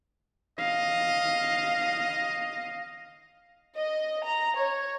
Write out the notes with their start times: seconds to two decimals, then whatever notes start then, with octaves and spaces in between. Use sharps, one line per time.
0.59 D#5 F5
3.77 D#5
4.24 A#5
4.56 C#5